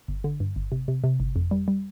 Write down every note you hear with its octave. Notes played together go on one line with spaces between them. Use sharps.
G1
D3
G2
G1
C3
C3
C3
G1
F2
G3
G3